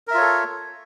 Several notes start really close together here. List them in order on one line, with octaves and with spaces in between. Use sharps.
A#4 E5 F4 C#5 A4